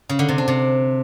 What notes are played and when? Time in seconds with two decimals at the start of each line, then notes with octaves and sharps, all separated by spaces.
0.09 C#3
0.19 D3
0.29 C3
0.38 D4
0.48 C3